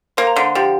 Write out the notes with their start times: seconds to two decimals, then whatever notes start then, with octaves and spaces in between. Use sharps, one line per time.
0.17 A#3 C5 C6
0.27 A#5
0.36 D3 C5 C6
0.55 F3 G4 G5